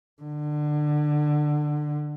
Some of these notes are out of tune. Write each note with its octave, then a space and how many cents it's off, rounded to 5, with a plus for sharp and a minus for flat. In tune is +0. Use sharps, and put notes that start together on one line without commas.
D3 +20